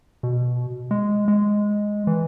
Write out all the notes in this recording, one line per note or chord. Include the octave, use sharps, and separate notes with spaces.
B2
G#3
G#3
E3